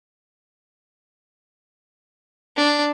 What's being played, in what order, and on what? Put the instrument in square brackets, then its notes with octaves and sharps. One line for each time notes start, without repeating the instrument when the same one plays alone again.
[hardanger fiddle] D4